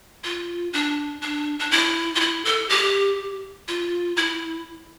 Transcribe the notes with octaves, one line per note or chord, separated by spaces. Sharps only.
F4
D4
D4
D4
E4
F4
E4
A4
G4
F4
E4